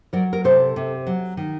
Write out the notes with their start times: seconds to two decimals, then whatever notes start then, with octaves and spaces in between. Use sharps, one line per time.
0.13 F#3 A#4 D5
0.33 A#4
0.44 C3 A4 C5
0.76 C3
1.07 F#3
1.37 D#3